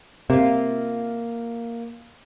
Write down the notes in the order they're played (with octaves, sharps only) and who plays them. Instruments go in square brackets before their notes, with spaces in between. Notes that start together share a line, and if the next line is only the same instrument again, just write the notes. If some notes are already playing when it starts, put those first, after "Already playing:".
[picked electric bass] C3 [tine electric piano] A#3 [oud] F4 E5